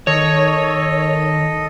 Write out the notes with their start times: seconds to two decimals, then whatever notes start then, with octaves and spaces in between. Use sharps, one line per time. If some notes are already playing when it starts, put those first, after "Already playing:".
0.07 D#3 A4 C#5 D#5